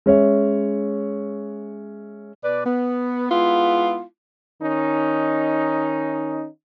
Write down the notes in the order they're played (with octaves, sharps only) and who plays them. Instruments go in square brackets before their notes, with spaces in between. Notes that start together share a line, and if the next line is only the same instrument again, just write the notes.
[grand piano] G#3 C#4 C#5 E5
[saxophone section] B2 B4 D5
B3
G#3 B3 E4 F4
[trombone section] D#3 C#4 D#4